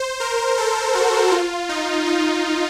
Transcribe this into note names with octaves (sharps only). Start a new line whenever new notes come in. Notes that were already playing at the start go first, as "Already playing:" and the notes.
Already playing: C5
A#4
A4
F#4
F4
D#4
D#4